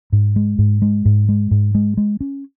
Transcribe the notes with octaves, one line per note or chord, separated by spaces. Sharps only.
G#2
G#3
G#2
G#3
G#2
G#3
G#2
G#3
G#3
C#4